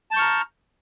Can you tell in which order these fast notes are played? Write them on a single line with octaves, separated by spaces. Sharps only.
A5 G6 C#6 F6 A#5